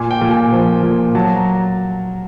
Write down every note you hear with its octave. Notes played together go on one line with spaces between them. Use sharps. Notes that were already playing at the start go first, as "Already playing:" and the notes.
Already playing: A#2 G#5
G5
A#2
G#5
F3
A#2
F#3 A5
A#5